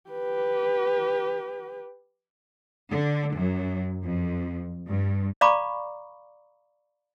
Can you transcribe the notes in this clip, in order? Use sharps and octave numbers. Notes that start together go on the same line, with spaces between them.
G4 B4
D3
F#2
F2
G2
D5 F5 A#5 B5 C#6 D6